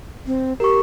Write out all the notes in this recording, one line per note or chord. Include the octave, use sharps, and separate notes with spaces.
C4
G4 A#4 C#6